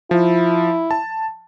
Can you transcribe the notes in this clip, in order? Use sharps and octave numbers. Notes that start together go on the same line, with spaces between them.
F3 E4
A5